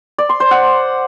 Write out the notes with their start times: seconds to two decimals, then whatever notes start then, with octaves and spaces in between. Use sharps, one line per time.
0.18 D5
0.29 C6
0.40 C5
0.51 F#5